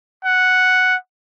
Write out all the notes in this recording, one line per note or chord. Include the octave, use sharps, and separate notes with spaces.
F#5